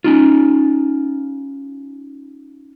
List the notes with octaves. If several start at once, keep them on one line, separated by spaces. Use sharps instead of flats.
C#4 D#4 F4